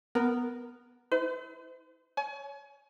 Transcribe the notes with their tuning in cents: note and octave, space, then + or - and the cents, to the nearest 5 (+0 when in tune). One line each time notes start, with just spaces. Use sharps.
B3 +0 A#4 +0
E4 -35 C5 -45
C#5 +20 G#5 +35